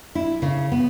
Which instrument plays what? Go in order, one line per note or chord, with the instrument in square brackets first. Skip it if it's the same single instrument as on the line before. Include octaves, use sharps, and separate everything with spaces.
[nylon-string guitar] E4
C#3
B3